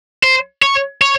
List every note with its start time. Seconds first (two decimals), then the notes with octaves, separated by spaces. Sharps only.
0.23 C5
0.62 C#5
1.02 C#5